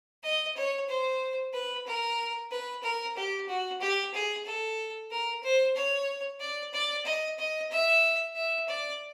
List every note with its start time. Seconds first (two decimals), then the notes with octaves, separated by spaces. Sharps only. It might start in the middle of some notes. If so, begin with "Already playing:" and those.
0.23 D#5
0.56 C#5
0.89 C5
1.53 B4
1.86 A#4
2.51 B4
2.83 A#4
3.16 G4
3.48 F#4
3.81 G4
4.14 G#4
4.45 A4
5.11 A#4
5.43 C5
5.76 C#5
6.40 D5
6.73 D5
7.05 D#5
7.38 D#5
7.71 E5
8.36 E5
8.68 D5